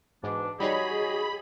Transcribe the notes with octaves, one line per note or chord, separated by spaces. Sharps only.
G#2 B2 E3 D4
G3 D#4 F#4 G#4 C#5 D#5 B5